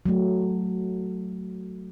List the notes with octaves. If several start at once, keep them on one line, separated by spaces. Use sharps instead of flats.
F#3 A3